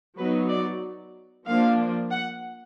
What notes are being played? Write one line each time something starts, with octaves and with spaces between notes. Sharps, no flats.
F#3 B3 D#4 B4
D5
F3 A#3 D4 F5
F#5